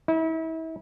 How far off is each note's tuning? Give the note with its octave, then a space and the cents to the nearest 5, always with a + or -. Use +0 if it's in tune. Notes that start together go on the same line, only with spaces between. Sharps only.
E4 -35